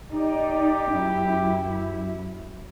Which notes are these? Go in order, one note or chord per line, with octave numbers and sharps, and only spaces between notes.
D#4 G4 D5
F#2 E4